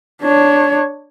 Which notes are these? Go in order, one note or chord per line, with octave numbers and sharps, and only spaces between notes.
D4 C#5